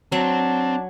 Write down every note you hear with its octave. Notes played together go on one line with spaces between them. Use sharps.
F#3 C4 D4 A5